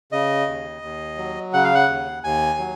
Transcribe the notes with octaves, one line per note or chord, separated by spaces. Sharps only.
C#3 D#5
D#2
D#2
F#3
C#3 F#5
F5
F#5
D#2
D#2 G#5
F#3